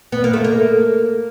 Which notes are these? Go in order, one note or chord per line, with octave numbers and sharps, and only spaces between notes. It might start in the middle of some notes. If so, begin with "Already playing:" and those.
B3
A#3
A3
A#3